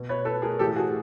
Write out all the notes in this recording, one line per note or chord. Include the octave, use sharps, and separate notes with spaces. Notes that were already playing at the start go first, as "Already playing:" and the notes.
Already playing: B2
B4 C#5
A4 B4
G#4 A#4
A2 E3 G4 A4
F#4 G#4